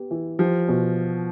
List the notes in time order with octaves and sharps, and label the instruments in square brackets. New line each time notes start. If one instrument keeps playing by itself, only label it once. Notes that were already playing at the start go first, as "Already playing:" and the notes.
Already playing: [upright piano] B3 G4
E3
[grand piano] F3 [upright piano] G4
[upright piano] B2